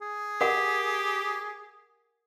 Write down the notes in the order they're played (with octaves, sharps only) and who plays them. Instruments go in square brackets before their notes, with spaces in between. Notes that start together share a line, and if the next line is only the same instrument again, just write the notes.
[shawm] G#4
[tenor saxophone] G4 [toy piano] A#4 F#5